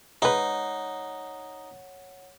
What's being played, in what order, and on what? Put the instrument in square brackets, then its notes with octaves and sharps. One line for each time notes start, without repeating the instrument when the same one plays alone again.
[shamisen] G#3 B4 [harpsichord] D#4 [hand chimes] C#5 F#5